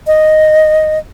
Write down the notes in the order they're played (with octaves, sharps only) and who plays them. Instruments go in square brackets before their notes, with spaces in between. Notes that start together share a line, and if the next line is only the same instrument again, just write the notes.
[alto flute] D#5